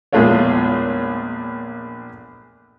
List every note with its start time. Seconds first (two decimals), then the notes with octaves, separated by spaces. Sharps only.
0.13 A#1 E2 G#3 A3 F4 C#5